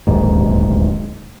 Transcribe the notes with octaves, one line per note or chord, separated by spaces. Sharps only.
D1 A#1 D#2 G#2